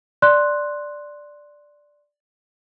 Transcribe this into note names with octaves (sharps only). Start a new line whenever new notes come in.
D5 C6 F#6